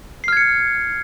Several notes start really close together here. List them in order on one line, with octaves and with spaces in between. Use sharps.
C7 F6 G#6 C#7